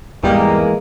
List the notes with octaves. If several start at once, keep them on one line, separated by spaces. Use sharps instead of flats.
E2 G#2 E3 G3 G#3 A#3